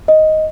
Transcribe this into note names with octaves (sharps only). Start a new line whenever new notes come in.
D#5